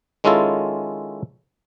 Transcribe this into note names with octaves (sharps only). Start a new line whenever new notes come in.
D#3 G#3 C#4 E4 F4 A4